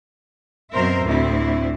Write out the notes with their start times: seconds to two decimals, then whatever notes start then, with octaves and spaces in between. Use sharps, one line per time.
0.73 F#2 B2 C4 A#4 C5 E5
1.04 D2 A2 C4 E4